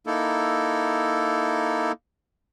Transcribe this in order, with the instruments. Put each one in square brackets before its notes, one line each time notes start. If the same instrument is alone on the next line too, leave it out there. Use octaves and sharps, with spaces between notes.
[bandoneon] A#3 D#4 E4 A4